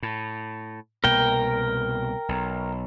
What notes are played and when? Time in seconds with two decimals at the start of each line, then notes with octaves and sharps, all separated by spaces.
0.03 A2
1.04 C2 B2 A#3 A#4 G5
2.29 B1